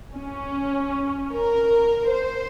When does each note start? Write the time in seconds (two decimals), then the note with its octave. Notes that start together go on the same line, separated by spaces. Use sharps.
0.17 C#4
1.33 A#4
2.10 C5